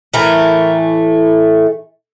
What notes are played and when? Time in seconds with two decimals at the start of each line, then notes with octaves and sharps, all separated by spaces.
0.14 A2 E3 A3 A#4